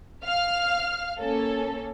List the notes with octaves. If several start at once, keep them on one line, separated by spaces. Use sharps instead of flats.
F5 F6
A#3 C#4 A4